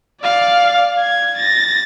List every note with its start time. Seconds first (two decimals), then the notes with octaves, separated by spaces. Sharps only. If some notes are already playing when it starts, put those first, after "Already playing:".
0.22 D5 F5
1.00 G#6
1.37 A6 A#6